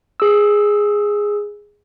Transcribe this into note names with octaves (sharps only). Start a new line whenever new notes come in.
G#4 E6